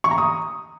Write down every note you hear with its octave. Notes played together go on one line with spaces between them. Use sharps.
C#6
A#5
D#6